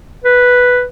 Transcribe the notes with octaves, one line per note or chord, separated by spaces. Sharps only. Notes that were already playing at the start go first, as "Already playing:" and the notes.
B4